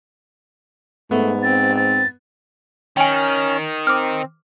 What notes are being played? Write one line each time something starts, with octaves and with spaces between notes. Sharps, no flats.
G#2 A3 B3
C4 A6
A6
D#3 C#4 G5 G#5
C4 D6 F6